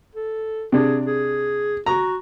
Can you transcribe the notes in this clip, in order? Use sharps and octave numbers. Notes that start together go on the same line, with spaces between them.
A4
C3 D4 G#4
G#4
F#4 A#5